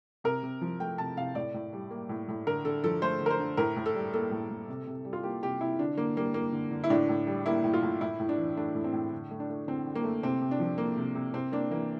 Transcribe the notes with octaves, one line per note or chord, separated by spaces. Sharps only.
C3 A#4
C3
F3
A3 G5
C3 A5
C3 F5
A2 D5
A2
G3
A#3
A2
A2
D3 A#4
D3 A4
F3 A4
A3 C5
D3
A#4
C5
D3
A2 A#4
A2
A4
G3
A#3 A4
A2
A2
C3
C3
G3
F4
A#3 G4
C3 G4
C3 E4
D3 D4
D3 A#3
G3 A#3
A#3
D3
D3
E4
A2 D4
A2
G3
A#3 E4
A2
F4
A2
A2 E4
A2
D4
E3
A3 D4
A2
C4
A2
D3
A3
D4
A3
D3 C4
D3
A#3
A3
C3 C4
C3
D4
F3
A#3
C3
C3
C3 C4
A#3 D4
E3 A#3